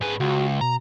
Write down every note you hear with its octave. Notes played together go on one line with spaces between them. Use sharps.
G#2 G#4 B4
C#2 F#4
B2 A#5